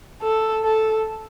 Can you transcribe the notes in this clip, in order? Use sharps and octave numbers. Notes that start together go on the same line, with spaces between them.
A4
A4